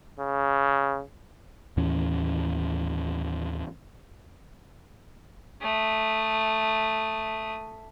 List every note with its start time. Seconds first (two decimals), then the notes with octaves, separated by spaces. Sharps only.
0.20 C#3
1.77 D#2 A2 E3 C#4
5.61 A3 D#6